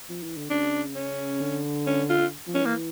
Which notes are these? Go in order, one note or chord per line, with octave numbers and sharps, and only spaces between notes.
F3
E3
D3
C#3 D4
C#4
D3
C#4
F4
F3
C#4
E3 A#3